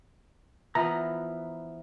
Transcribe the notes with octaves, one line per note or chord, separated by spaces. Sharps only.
E3 F3 B3 A#5